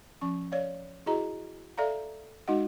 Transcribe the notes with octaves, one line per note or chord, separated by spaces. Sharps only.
F3 C#4 C#6
C#5 D5 F5
E4 F#4 G#4 D#5 A#5
A4 D5 E5 F5 A#5
G#3 D#4 F#4 D#5 F#5